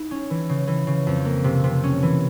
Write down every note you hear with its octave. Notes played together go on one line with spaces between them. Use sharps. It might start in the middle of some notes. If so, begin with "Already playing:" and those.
Already playing: D#4 E4
C#4
E3
C#3
E3
C#3
F2
A#3
C3
C3
C#4
E3